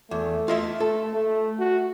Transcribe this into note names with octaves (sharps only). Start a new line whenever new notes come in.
E2 A3
F4 D#5 E5
A3 A4
A3
F#4